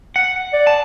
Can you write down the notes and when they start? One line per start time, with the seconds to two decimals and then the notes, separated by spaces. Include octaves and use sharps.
0.16 F#5
0.53 D5
0.67 A5